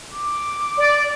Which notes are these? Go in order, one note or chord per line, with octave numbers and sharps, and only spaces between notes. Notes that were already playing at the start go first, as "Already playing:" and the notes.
D6
D5